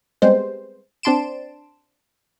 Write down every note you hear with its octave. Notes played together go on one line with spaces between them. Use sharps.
G3 G#3 B3 C4 C5
C4 D4 A5 C6 D7 E7